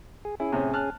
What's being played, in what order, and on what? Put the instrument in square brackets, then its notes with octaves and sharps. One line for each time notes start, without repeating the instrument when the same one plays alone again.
[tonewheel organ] G#4
[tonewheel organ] C#4 G#4 [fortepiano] E4
[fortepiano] A2 C3
A5 F6 F#6